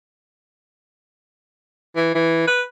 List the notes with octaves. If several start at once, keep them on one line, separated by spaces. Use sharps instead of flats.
E3
E3
B4